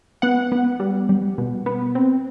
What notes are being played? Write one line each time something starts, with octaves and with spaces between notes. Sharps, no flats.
B3 F#5
B3
G3
G3
B2
B3
C4